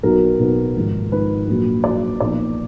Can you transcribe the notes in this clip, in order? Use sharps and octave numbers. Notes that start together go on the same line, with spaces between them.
B1 B2 F#3 B3 A#4
B1 B2 F#3 B3
G#1 G#2 F3
G#1 G#2 F3 B4
A#1 A#2 F#3
A#1 A#2 F#3 D5
B1 A#2 F3 B3 D5